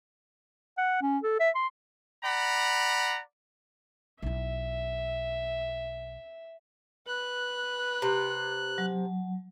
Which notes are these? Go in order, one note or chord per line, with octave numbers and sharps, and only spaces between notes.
F#5
C#4
A4
E5
C6
D5 F#5 A#5 B5
B1 E4 E5
B4 F#6
C3
F#3